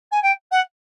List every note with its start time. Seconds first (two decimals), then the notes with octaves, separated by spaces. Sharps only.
0.11 G#5
0.23 G5
0.51 F#5